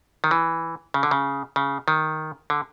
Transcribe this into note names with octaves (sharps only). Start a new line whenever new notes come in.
D#3
E3
C#3
D3
C#3
C#3
D#3
D3